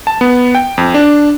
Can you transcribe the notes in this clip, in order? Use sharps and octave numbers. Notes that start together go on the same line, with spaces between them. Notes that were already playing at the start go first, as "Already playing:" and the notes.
A5
B3
G5
F2
D4